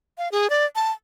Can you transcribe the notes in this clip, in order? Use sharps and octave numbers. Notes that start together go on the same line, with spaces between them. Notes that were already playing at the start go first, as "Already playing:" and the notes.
F5
G#4
D5
A5